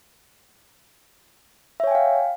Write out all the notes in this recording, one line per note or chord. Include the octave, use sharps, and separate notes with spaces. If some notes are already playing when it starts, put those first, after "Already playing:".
C#5 E5 F5 G5 G#5